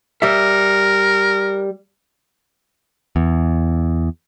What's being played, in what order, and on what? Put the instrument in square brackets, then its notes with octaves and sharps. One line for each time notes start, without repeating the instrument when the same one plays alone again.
[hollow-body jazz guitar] G3 E5 [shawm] A#4
[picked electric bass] E2